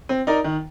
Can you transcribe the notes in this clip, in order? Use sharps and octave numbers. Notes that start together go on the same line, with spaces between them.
C4
D#4 A#4 D5
D#3